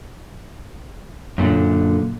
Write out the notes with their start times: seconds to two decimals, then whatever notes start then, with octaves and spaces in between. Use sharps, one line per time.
1.38 F#2 A#2 D3